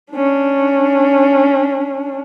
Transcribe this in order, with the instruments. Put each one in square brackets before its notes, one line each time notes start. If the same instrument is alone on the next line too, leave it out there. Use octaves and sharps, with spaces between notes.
[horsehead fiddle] C#4 D4